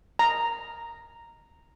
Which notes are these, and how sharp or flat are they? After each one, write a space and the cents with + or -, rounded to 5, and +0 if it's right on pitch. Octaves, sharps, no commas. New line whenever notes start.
A#5 -5